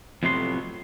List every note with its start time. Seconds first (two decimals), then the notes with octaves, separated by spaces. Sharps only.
0.23 F2 A2 C3 F#3 B3 C6